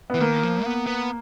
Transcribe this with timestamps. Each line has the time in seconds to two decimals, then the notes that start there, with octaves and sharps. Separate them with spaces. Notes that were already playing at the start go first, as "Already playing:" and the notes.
0.10 E3 B3
0.20 D#3 A#3
0.43 F3
0.64 B3
0.86 B3